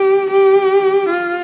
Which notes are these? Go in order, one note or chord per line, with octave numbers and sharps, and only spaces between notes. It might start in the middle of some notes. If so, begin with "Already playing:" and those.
Already playing: G4
G4
F4